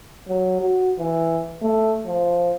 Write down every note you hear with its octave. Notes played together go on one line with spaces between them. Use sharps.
F#3
F#4
E3
A3
F3